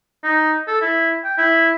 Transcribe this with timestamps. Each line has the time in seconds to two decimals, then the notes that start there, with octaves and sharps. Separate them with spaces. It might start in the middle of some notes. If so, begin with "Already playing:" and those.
0.24 D#4
0.68 A4
0.81 E4
1.24 G5
1.38 E4